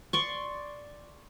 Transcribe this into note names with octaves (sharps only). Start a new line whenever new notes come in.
D5 C6 C#6